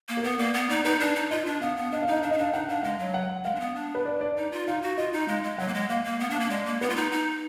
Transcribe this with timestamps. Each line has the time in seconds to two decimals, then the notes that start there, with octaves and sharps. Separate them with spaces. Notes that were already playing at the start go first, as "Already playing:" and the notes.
0.09 A#3
0.17 A#4
0.24 B3 B4
0.39 A#3 D5
0.54 B3
0.70 D#4 D5
0.85 D#4 B4
1.00 D4 D5
1.16 D#4
1.31 F4 D#5
1.46 D4
1.62 B3 F5
1.77 B3
1.92 D4 D#5
2.02 F5
2.07 D#4 D#5
2.23 D4 F5
2.31 D#4 D#5
2.38 D4 F5
2.53 D#4 F#5
2.69 D4 F5
2.83 G#3 F5
2.99 F#3
3.14 F#5
3.44 G#3 F5
3.55 D4
3.60 B3
3.75 D4
3.95 B4
4.05 D5
4.21 D5
4.37 D#4
4.52 F4
4.67 D#4 F5
4.82 F#4
4.98 F4 D#5
5.13 D#4
5.28 G#3 F5
5.44 G#3
5.58 F#3 F#5
5.68 A#3
5.74 G#3
5.89 A#3 F5
6.04 A#3
6.20 B3 F5
6.30 D4
6.35 F5
6.40 A#3
6.50 G#3 D5
6.66 A#3
6.81 B3 B4
6.90 F4
6.96 D#4
7.12 D#4